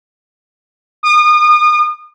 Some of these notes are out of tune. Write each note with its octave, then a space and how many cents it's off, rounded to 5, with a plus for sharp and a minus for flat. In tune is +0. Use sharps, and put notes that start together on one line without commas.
D#6 -35